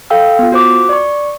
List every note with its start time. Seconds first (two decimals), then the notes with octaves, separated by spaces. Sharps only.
0.10 A4 F5 G5 E6
0.39 B3 F4
0.52 F#4 C5 D6
0.89 D5 C#6